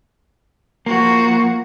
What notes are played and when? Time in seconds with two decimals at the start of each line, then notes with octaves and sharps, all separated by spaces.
0.86 F3 A#3 F#4